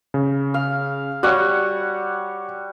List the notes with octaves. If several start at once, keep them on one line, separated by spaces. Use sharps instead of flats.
C#3
F5
G3 F#4 C#5 F#5 C#6